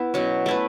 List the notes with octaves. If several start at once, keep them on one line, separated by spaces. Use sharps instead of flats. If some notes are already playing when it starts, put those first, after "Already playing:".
Already playing: B3 E4
B2 F#3 C#4
A3 E4 B4